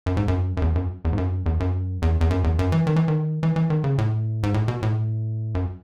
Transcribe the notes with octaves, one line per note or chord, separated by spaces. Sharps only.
F#2
G#2
F#2
F#2
E2
F#2
E2
G#2
F#2
E2
F#2
E2
E2
F#2
E2
F#2
E3
D#3
E3
D#3
E3
E3
D#3
C#3
A2
G#2
A2
B2
A2
F#2